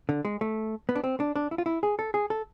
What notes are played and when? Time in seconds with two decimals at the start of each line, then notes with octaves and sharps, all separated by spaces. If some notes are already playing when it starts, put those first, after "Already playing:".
0.09 D3
0.25 G#3
0.41 A3
0.89 B3
0.96 D4
1.04 C4
1.20 D4
1.36 D4
1.51 E4
1.58 F4
1.66 E4
1.83 G#4
1.99 A4
2.14 G#4
2.30 A4